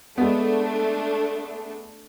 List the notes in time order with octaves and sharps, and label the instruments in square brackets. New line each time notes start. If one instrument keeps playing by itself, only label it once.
[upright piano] G#3 B3 [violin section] A3 D4